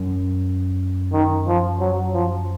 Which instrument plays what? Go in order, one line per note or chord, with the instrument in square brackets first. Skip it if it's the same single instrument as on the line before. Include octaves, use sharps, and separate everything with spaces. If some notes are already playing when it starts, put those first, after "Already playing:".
Already playing: [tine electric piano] F#2
[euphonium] D#3
F3
F#3
F3